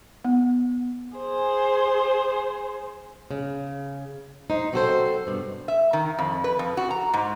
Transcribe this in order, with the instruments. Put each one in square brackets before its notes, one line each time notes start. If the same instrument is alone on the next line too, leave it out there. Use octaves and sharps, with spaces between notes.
[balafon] B3
[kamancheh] G#4 C5
[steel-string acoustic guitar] C#3
D#4 C5
F#3 C4 F#4 G4 A4 C5
G2 B2
[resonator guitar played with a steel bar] E5
D#3
F2
B4
F2
F#4
A#5
G#2